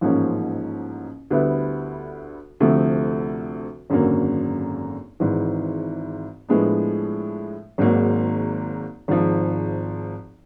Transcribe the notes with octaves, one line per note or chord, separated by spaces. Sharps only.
A1 G#2 F3 A#3 C#4
D2 D3 G3 B3 E4
D2 C3 F3 A3
G#1 F#2 D3 F#3 A#3
G#1 G#2 E3
A2 F3 G#3 B3 D4
G#1 G#2 D#3 F#3 A#3
G#1 G#2 F3